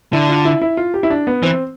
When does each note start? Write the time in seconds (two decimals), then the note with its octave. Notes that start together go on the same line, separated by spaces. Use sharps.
0.13 D3 E4
0.29 F4
0.45 E4
0.62 E4
0.77 F4
0.94 G4
1.03 E4
1.10 D4
1.27 B3
1.43 E3 C4